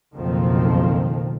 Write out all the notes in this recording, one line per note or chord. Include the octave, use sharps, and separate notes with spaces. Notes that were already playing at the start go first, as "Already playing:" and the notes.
F#1 B1 F2 D#3 F3 C4